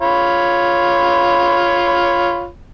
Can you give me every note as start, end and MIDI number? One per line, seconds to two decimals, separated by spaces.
0.01 2.47 65
0.01 2.47 73
0.01 2.47 83